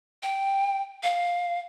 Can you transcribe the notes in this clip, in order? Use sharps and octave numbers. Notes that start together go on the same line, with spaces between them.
G5
F5